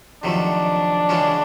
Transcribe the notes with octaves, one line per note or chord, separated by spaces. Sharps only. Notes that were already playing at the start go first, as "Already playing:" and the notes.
F2 C3 D#3 F#3 A3 D4
C#3 E3 G#3 C#4 F#4